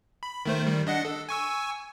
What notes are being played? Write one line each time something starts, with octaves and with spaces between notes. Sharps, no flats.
B5
D#3 A3 C5
D#3 G3
D4 D#5 F#5
A4
G#5 C#6 E6